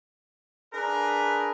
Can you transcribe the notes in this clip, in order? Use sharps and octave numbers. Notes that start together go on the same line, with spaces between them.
D4 G#4 A#4 B4